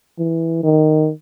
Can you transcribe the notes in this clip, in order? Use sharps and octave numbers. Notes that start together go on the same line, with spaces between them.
E3
D#3